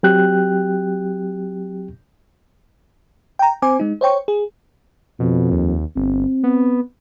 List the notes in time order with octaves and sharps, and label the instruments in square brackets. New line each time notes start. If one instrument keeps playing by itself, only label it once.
[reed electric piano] F#3 C4 G4 G5 F#6
[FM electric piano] G5 A#5
C4 C5 G#5 D6
G#3 D#4
C5 C#5 G5 C#6
G#4
[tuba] F2 [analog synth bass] B2
[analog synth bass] D#2
[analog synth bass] G1 [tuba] C4
[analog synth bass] B3